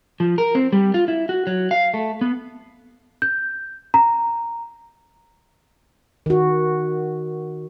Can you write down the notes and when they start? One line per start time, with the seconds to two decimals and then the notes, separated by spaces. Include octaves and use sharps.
0.20 F3
0.38 A#4
0.55 C4
0.72 G3
0.94 F4
1.08 E4
1.29 F#4
1.47 F#3
1.71 F5
1.94 A3
2.21 B3
3.22 G6
3.94 A#5
6.26 D#3 F#4